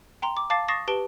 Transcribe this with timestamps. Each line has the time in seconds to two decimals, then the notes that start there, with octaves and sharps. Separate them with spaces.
0.22 G5 A#5 C6
0.37 D6
0.50 F5 A5 D6 A6 C7
0.68 C#6 D#6 A6 A#6 C7 E7
0.88 G4 B4 A5 D7 G7